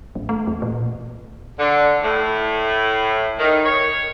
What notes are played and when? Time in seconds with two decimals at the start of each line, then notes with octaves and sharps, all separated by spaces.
0.15 A1
0.29 A3
0.47 E2
0.62 A#2
1.60 D3
2.03 A2
3.39 D#3
3.65 C#5